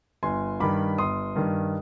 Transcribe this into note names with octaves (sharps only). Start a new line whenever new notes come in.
G1 G#5 C6
G2 D#3 B5 D6
G1 C6 D#6
G2 D#3